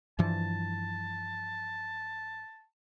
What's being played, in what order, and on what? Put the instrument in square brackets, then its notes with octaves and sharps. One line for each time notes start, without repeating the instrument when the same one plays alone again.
[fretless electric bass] G2 E3 F3 [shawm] A5